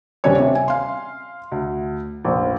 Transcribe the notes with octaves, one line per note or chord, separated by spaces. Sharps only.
D#1 G3 C#4 D4 C#5
C3
G#5
F5 C6
D2
F1 A#1